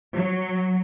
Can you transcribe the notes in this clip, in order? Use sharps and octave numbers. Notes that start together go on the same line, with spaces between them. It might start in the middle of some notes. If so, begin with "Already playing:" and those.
F#3